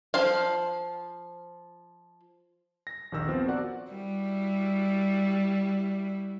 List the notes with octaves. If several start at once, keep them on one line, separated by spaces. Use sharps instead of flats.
F3 F4 F5
A#6
A#1 D#2 D#3 E6 A#6
F3 B3 C4
F#4 A#4 D5 F#5
G3 E4 F#4